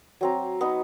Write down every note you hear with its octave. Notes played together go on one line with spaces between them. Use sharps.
F#3 C4 A#5
B3 D#4